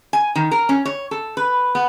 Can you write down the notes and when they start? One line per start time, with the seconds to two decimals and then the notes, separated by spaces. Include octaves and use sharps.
0.13 G#5
0.35 D#3
0.51 A#4
0.69 C#4
0.85 C#5
1.11 A4
1.37 B4
1.75 B3